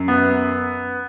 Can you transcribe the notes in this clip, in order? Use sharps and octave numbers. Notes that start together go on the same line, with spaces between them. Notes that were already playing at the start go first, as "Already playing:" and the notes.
Already playing: F#2
B3